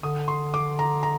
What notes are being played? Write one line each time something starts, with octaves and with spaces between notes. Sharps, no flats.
D3 D#6
C6
D6
A#5
A#5